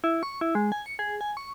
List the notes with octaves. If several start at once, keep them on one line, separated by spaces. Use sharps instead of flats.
E4
C#6
E4
G#3
G#5
C#7
G#4
G#5
C#6